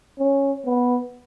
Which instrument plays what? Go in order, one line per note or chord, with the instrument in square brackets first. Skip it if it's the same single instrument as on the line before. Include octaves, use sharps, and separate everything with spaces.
[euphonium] C#4
B3